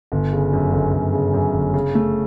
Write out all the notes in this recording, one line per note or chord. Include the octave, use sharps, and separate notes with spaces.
G1
C#3
F#2
G1
G1
C#3
F#2
G1
C#3
A3